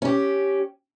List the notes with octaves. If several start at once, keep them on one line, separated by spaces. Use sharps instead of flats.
C#4 G4